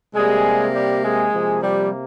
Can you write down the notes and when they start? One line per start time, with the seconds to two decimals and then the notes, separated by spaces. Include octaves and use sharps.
0.15 C3 G3 G#3 A#3 G#4
0.74 G3 G4
1.05 G#3 G#4
1.34 C3 F3 A#3
1.63 G3 G4